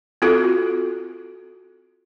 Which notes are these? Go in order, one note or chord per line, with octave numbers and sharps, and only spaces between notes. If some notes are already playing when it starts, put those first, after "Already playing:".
C4 F4 F#4 A4